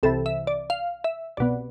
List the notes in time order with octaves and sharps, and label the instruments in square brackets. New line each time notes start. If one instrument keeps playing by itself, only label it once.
[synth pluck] C2 C3 E3 A4
E5
D5
F5
E5
C2 B2 B3 D5